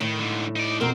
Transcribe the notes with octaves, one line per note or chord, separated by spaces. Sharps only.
A2 D#3
G#2 D3
D#4 D5
F2 B2 C4 A#4